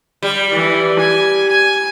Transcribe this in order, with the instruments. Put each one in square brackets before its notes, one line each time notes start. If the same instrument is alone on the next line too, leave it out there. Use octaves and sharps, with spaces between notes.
[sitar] G3
[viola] E3
G#5
G#5